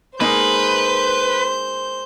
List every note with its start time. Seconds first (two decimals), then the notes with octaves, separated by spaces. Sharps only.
0.20 G#3 A#3 D#4 B4 C5 G6